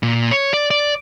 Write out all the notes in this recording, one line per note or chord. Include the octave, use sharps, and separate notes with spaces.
A#2
C#5
D5
D5